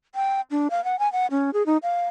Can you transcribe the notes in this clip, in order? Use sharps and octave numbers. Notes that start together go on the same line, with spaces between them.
G5
D4
F5
F#5
G#5
F#5
C#4
G#4
D#4
F5